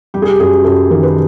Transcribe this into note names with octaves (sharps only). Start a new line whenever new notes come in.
G3 G4
G#4
G4
F#2 G#4
F#2 A4
D#3 A#4
B4